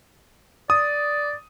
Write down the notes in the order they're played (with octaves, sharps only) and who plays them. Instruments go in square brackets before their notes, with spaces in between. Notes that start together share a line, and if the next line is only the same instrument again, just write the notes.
[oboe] D5 [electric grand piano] D#6